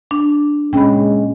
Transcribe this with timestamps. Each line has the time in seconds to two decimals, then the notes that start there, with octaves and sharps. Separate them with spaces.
0.11 D4
0.73 A#2 G#3 C#4 G5 B5